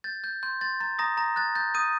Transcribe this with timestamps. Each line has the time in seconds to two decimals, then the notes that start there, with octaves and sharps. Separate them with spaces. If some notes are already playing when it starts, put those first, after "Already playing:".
0.04 G6 A6
0.24 G6
0.43 C6 G6
0.61 C6 A6
0.80 A#5 A6
0.99 A#5 D#6 A#6
1.17 A#5 A#6
1.36 F#6 A6
1.55 G6 A6
1.74 D#6 G6 D#7